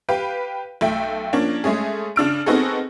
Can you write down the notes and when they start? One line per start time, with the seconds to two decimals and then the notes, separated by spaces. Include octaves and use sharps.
0.09 G4 B4 F5 G5
0.81 B1 A3 E5 G5
1.33 F3 A#3 C#4 D4
1.64 G#3 A3 C#4 G#4
2.16 C#3 D4 F6 D7
2.46 B3 C4 D#4 F#4 G#4 A4